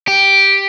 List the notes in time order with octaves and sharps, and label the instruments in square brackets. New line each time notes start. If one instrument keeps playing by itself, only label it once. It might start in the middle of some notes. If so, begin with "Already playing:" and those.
[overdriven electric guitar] G4